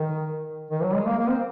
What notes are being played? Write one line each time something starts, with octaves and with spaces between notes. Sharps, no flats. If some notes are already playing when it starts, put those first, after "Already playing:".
Already playing: D#3
D#3
F#3
G#3
A#3
A#3
C4